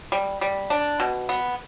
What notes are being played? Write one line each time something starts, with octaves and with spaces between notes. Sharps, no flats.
G3
G3
D4
B2
B3